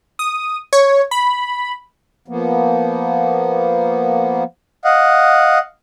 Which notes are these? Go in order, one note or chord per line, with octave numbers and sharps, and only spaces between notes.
D#6
C#5
B5
F3 A#3 B3
D#5 F5 F#5